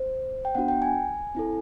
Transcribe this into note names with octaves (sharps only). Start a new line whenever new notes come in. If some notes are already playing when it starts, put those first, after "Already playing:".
Already playing: C5
G5
B3 D4 F#4 F#5
G5
G#5
C4 E4 A4